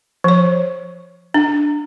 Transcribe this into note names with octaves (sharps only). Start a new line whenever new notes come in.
F3 C#5
D4